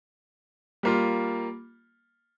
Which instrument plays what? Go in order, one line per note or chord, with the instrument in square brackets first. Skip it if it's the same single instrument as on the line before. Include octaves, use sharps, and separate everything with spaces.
[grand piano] G3 A#3 F4